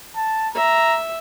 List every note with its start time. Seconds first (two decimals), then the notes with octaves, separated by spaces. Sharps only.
0.16 A5
0.54 E5 A#5